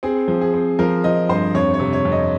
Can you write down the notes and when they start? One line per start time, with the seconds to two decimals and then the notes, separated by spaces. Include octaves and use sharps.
0.03 C4 G#4
0.28 F3
0.41 G#4
0.54 C4
0.79 F3 A#4
1.04 F3 D#5
1.29 G2 C5
1.55 F2 C#5
1.74 C#5
1.80 C3
1.93 C#5
2.05 F2
2.12 D#5